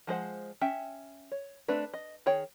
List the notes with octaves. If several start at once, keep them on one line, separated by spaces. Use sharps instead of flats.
F3 G#3 C5 F#5
C#4 E5 G5
C#5
A3 C4 D4 B4
D#5
D#3 G#4 C#5 G5